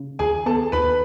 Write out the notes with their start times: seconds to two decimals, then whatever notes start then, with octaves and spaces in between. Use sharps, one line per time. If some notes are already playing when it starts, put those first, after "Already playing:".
Already playing: C#3
0.19 D#2 G#4 G#5
0.46 B3 A4 A5
0.72 D#2 B4 B5